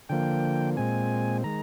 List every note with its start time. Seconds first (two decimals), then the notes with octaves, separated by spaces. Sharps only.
0.09 D3 F3 A#3 G5
0.77 A#2 G#3 C4 G#5
1.44 D#3 G#3 A#5